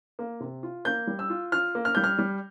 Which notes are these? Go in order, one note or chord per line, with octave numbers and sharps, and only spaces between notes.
A#3
C3
F4
A#3 G6
G3
E6
F4
F4 F6
A#3
F6
G3 G6
F6
G3